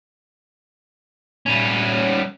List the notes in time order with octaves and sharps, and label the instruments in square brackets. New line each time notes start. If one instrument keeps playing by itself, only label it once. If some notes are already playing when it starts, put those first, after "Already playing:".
[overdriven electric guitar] G3 C#4